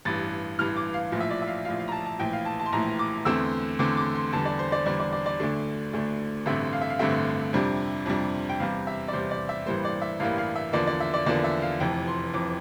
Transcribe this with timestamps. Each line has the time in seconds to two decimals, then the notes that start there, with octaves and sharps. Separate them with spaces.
0.05 A1 G2 E3 A6
0.59 A1 G2 E3 F6
0.77 D6
0.94 F5
1.12 A#1 A2 F3
1.20 E5
1.31 D5
1.42 E5
1.48 F5
1.65 A#1 A2 F3 F5
1.79 F5
1.88 A#5
1.92 A5
2.06 A5
2.19 A#1 A2 E3 G5
2.33 F5
2.45 A5
2.60 A5
2.66 C6
2.72 A#1 A2 E3 A#5
2.99 D6
3.25 E2 D3 A3 C4 E6
3.79 E2 D3 A3 C4 D6
3.97 D6
4.15 C6
4.33 E2 D3 G3 A5
4.45 D5
4.59 C5
4.72 D5
4.86 E2 D3 G3 D5
5.00 D5
5.12 D5
5.26 D5
5.40 D2 D3 A3 D4
5.93 D2 D3 A3 D4
6.46 A1 G2 D3 A3 C4 E5
6.73 F5
6.81 E5
6.90 F5
6.99 A1 G2 D3 A3 C4 E5
7.53 F2 C3 G3 D4
8.06 F2 C3 G3 D4
8.49 G5
8.60 E2 C3 G3 F5
8.87 E5
9.08 D5
9.13 E2 C3 G3 C5
9.31 D5
9.49 E5
9.66 A1 G2 E3 G3 A#3 C5
9.85 D5
10.02 E5
10.20 A1 G2 E3 G3 A#3 F5
10.38 F5
10.56 E5
10.73 E2 D3 F3 A#3 D5
10.87 D5
11.00 E5
11.14 D5
11.26 E2 D3 F3 A#3 D5
11.44 E5
11.62 F5
11.80 F1 F2 E3 G5
12.07 C6
12.34 F1 F2 E3 D6